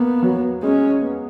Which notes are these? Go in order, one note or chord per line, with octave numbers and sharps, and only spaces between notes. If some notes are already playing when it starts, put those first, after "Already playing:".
Already playing: A#3 B3
F#3
G#3 C#4
B3